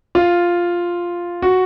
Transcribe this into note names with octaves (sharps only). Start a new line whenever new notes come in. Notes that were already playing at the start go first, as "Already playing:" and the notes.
F4
F#4